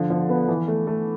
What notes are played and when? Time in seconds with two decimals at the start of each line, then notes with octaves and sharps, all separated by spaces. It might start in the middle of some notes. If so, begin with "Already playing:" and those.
Already playing: D3 F3
0.10 F3
0.29 B3
0.48 E3
0.68 A3
0.87 A3